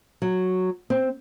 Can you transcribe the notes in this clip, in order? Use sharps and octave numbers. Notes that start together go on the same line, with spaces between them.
F#3
C4